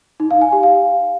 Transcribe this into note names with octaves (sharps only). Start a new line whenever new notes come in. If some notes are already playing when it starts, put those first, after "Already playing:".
D#4
F5
G#5
G4
F5